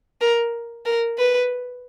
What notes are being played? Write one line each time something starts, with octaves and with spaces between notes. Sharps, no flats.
A#4
A#4
B4